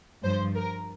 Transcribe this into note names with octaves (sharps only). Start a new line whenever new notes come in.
G2 F3 C5
A#4